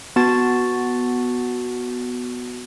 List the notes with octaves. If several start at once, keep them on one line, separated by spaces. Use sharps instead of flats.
B3 F#4 A5 A6